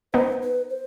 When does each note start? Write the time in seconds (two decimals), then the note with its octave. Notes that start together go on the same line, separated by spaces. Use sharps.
0.14 B3 D#4 C5
0.42 B4
0.70 C5